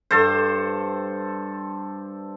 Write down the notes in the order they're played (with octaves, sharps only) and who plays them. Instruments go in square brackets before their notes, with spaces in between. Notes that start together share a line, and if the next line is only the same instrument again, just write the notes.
[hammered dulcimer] G2 A4 C5